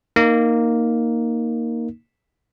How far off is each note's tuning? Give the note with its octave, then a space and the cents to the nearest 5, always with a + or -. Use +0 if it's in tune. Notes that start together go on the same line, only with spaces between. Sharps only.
A#3 +0 D#4 +0